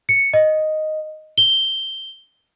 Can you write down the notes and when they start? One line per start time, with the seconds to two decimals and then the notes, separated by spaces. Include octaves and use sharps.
0.09 C#7
0.34 D#5
1.38 G7